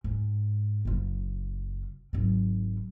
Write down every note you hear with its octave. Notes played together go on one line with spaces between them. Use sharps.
G#2
F#1 F4
G#1 F#3